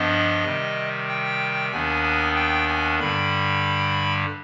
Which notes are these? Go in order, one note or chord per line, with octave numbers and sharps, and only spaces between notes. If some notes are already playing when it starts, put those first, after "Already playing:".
Already playing: G2 F3 B3 D4 D#5
C3 D#3 G3
G5
D#2 D#3 B3 D4 G#5
G#5
G5
G#5
G2 D3 G3 B5